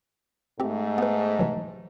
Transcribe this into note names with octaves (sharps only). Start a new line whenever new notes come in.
G#2 A3 C4 G4
B3 B4
C3 E3 F#3